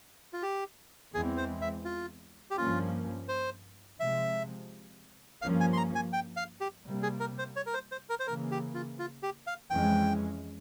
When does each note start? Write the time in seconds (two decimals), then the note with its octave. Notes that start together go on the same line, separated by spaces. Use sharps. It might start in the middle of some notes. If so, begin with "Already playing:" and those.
0.33 F4
0.43 G4
1.14 E2 E3 G#3 C4 G#4
1.37 C5
1.61 E5
1.85 F4
2.51 G4
2.57 G2 F3 A#3 C#4 F4
3.28 C5
3.99 C3 F3 G#3 E5
5.42 G2 F3 A#3 C#4 F5
5.61 G#5
5.73 C6
5.77 A#5
5.95 G#5
6.13 G5
6.37 F5
6.61 G4
6.85 C3 G3 A#3
7.03 G#4
7.20 A#4
7.38 C5
7.56 C#5
7.66 A#4
7.74 C5
7.92 C5
8.09 A#4
8.20 C5
8.27 C#3 E3 A#3 A#4
8.51 G4
8.74 F4
8.99 F4
9.23 G4
9.47 F5
9.70 F2 E3 G#3 C#4 G5